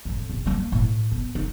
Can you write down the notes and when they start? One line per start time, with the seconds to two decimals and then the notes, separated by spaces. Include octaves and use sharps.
0.05 F2 A2
0.30 A#1
0.46 G3 A#3
0.72 A2
1.12 B3
1.35 D#4